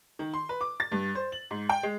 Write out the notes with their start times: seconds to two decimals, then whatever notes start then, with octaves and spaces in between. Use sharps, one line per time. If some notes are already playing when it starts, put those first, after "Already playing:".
0.19 D#3
0.34 C6
0.49 B4
0.61 D6
0.80 A6
0.92 G2
1.15 C5
1.32 F#7
1.51 G#2
1.69 G5
1.83 G#3